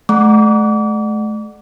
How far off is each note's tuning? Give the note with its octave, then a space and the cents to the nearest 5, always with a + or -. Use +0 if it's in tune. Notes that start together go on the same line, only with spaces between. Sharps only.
A3 -35 F#5 +0 D6 -35